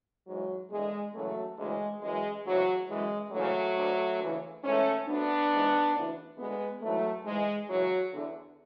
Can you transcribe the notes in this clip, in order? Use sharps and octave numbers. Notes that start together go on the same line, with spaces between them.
G#2 E3 F#3
E2 D3 G#3
F#2 C#3 E3 F#3 A3
D2 C#3 E3 G#3
F#2 E3 G#3
D2 C#3 E3 F#3
F#2 E3 G#3
D2 C#3 E3 F#3 A3
D2 D3
D2 C#3 E3
G#2 E3 A3 C#4
D2 D3 B3 D4
G#2 E3
D2 C#3 E3
D2 D3 G#3 B3
G#2 E3 F#3 A3
G#2 E3 G#3
F#2 C#3 E3 F#3
E2 D3